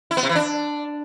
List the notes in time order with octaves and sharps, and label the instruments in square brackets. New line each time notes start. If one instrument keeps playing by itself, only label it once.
[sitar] E4
B3
C3
E3
D4